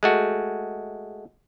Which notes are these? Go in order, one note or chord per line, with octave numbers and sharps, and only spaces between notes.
G#3 A3 F#4